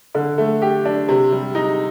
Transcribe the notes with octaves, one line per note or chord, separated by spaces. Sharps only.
D3
A3
G4
D4
C3
G3
D#4